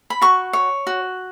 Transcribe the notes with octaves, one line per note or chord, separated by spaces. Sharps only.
B5
F#4 C#6
C#5
F#4